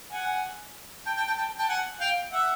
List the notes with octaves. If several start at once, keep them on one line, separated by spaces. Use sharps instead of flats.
F#5 G#5
G5 A5
G5 A5
G5 A5
G5 A5
G5 A5
F#5 G#5
F5 G5
E5 F#5